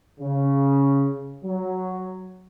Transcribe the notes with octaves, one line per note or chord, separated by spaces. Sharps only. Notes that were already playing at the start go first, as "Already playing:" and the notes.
C#3
F#3